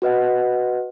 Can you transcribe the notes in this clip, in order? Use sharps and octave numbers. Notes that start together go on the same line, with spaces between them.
F#4 B4 D#5 F#5